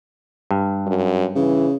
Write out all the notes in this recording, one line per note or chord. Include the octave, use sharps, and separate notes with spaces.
G2
F#2
C#3 E3